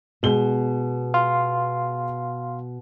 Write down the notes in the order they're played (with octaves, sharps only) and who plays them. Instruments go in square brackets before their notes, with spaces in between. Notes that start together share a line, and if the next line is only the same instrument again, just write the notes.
[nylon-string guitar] B2 [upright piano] G#3 G7
[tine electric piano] F5 C6